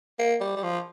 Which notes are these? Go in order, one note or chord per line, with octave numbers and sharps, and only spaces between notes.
A#3
G3
G3
F3